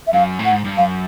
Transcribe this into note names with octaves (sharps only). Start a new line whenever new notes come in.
E5
F#2 F5
A2
F#5
G#2
G2
F#2 F5